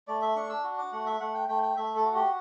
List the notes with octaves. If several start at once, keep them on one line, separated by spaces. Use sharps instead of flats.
A3 D5
E5
D4 C#6
E6
F#4
D6
A3 F#5
E5
A3 F#5
G5
A3 G5
G5
A3 E5
A4
F#4
G4